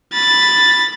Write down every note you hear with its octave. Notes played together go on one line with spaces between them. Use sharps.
B5 A6